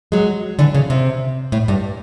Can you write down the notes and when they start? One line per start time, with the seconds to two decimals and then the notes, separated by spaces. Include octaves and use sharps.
0.12 F#3 G#3
0.59 D3 E3
0.74 C#3
0.90 C3
1.52 A2
1.68 G2